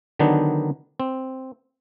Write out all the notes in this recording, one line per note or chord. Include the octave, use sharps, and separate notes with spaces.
D3 D#3 F#3 B3 D4 D#4
C4